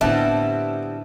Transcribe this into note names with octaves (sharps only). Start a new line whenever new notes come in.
A2 D3 G3 B3 C4 E4 E5 A5